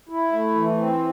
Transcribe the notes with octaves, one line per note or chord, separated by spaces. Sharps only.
E4
A3
E3
C4